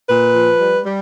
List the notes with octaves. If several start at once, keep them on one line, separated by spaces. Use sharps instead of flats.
A#2 B4
F3
G3
G3